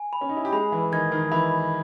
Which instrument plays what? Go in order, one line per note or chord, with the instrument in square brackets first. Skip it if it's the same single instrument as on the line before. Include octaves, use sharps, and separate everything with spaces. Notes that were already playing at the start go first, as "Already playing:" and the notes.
Already playing: [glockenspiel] G#5
B5
[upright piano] C#4
D#4
E4
G4
[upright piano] G#3 G#4 [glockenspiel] B5
[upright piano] E3 E4
[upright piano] D#3 D#4 [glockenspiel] G#6
[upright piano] D#3 D#4
[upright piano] E3 E4 [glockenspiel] B5